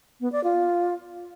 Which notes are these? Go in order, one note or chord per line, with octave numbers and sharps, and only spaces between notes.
B3
D5
F4